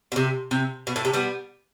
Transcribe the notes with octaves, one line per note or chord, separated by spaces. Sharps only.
B2
C3
C3
B2
A2
C3
G3 B3